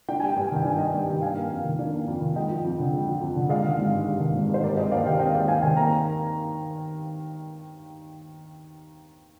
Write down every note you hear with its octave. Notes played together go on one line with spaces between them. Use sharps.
D4 G5
G3 G#5
G2 G5
G#5
D#3 G5
D4 G#5
G3 D#5 G5
G2
D#3
D4 F5 G#5
A#3
F2
D#3
D4
A#3
F2
D#3
G#3 D#5 G5
F3
F2
D3
G#3
F3
F2
D3
G#3 D5 F5
D#3
G#1
G2
G#3
D#3
G#1
G2 C5
C4 A#4 D5
G#3 C5 D#5
D#2 D5 F5
D#3 D#5 G5
C4 D#5 G5
G#3 D5 F5
D#2 F5 G#5
D#3 F5 G#5
A#3 A#5